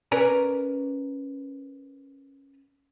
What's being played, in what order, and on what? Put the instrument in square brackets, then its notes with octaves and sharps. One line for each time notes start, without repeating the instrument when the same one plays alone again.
[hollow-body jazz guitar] C#4 A#4 B4 D5 G#5 A#5